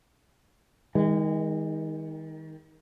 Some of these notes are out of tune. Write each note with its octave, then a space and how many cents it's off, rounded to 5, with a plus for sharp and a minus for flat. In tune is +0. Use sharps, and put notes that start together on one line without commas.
D#3 +25 G#3 -30